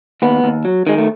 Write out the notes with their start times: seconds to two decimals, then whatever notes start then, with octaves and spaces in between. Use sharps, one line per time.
0.22 D#2 B3
0.44 D#2
0.65 F#3
0.87 D#3 G#3
0.98 A3